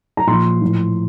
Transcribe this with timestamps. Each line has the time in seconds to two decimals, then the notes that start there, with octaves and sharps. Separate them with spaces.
0.17 A#5
0.27 A#2 F3 C6
0.62 A2 F3